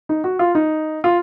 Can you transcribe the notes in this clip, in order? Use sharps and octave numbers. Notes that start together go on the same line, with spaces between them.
D#4
F#4
F4
D#4
F4